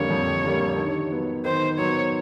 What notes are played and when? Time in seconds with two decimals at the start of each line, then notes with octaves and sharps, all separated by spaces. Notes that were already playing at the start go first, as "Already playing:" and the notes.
Already playing: F2 D3 G3 A#3 C#5
0.10 F2
0.44 D3 G3 A#3
0.78 D#3
1.11 F#3 B3
1.45 D#3 C5
1.78 F#3 B3 C#5